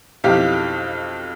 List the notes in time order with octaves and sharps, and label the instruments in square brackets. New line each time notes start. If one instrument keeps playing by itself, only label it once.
[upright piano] B1 F2 E3 G4 F5